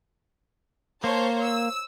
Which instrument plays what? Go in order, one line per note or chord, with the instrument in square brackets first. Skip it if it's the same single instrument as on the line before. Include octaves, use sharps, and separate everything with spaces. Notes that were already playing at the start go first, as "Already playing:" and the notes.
[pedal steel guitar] A#3 [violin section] C5 C#5 A5
[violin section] E6